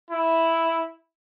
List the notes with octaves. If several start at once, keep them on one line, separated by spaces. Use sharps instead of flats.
E4